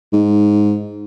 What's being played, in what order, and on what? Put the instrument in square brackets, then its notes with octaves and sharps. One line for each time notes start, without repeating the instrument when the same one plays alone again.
[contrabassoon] G#2